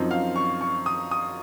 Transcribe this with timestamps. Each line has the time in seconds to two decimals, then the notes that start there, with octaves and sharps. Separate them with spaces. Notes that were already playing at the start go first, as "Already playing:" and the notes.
Already playing: F#2 F3 C4 D#4
0.11 F5
0.36 C#6
0.61 C#6
0.86 D#6
1.11 D#6